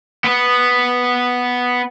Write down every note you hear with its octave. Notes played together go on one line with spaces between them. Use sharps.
B3 B4